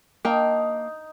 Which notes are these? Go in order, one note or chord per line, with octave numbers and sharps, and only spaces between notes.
A#3 D#4 G5 A5